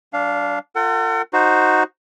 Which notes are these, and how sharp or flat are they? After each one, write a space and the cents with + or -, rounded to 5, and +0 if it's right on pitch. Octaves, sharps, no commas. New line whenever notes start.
F#3 +40 D4 -15 F5 +0
F4 +0 A4 +45 F#5 +30
D#4 +0 F#4 +0 C5 +5